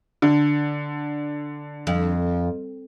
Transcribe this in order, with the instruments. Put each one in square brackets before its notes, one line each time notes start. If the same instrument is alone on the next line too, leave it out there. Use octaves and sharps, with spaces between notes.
[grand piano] D3
[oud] F2